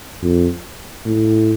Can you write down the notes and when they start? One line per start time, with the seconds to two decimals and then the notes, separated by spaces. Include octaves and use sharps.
0.22 F2
1.06 A2